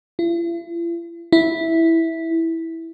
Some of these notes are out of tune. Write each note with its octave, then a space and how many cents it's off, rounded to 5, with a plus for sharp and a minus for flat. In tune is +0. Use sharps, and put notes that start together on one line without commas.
E4 +45
E4 -5